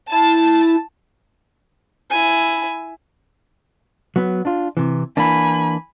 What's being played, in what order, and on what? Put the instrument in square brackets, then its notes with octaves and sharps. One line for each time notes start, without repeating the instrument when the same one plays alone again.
[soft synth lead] E4 [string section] A5
[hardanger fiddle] E4 G#5
[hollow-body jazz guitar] F#3 B3
D4 F4
C3 E3
[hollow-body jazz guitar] E3 A#3 D4 [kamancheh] G#5 B5